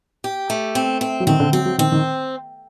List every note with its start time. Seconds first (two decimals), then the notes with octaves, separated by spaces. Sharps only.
0.24 G4
0.50 A3
0.75 C4
1.01 C4
1.20 F#3
1.27 D#3 C4
1.40 D3
1.53 F#3 C4
1.65 F#3
1.78 D#3 C4
1.92 D#3